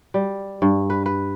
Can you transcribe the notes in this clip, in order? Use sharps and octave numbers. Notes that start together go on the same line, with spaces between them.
G3
G2
B4
B4